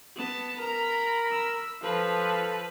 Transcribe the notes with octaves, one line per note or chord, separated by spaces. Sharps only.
B3 A5
A#4 A#5 B5
E6
F3 A4 B4